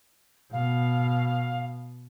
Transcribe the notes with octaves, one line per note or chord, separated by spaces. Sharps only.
B2 F5